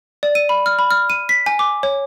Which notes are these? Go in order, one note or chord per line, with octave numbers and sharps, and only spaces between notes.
D5
D#7
B5
F6
B5
F6
D#7
B6
G#5
D6
C#5